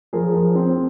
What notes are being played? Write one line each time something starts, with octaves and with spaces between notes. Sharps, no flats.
F3 G#4 A#4
F3
C4